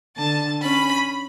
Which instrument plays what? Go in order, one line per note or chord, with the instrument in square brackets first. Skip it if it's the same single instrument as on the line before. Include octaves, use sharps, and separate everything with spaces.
[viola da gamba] D3 [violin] A5
[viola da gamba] C#4 [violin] B5